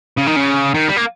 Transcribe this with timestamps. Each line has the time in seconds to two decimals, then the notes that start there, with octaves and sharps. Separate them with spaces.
0.17 C#3
0.27 D#3
0.36 C#3
0.74 D#3
0.88 G3
0.96 A#3